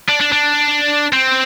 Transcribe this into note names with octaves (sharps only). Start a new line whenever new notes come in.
D4
D4
D4
C4